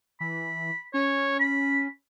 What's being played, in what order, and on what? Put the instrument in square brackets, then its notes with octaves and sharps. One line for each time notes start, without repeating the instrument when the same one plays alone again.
[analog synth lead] E3 [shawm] B5
[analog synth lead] C#4 [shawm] C#5
[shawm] B5